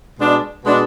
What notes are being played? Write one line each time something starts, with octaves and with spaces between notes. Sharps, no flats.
B2 G#3 D4
B2 G#3 D4